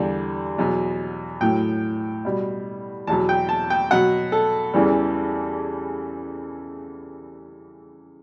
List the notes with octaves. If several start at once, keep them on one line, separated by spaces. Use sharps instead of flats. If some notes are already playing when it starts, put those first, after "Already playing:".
Already playing: E2 D3 G3
E2 B2 F#3
A2 F#3 G5
B2 G3
E2 B2 F#3 A5
G5
A5
G5
B2 F#3 F#5
A4
E2 C#3 E3 G3